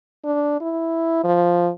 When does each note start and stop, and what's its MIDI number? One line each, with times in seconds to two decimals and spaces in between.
0.25 0.60 62
0.61 1.23 64
1.24 1.70 53